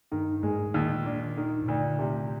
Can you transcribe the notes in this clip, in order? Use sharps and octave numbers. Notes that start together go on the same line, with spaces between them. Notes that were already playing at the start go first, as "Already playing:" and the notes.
G2 D#3
G#2 G#3
G#2
D#2 A#2
D4
D#3
G#2
D2 A#2
C3